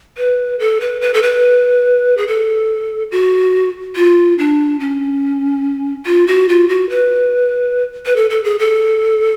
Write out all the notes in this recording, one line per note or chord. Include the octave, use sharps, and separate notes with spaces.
B4
A4
B4
B4
A4
B4
G#4
A4
F#4
F4
D4
C#4
F4
F#4
F4
F#4
B4
B4
A4
A4
G#4
A4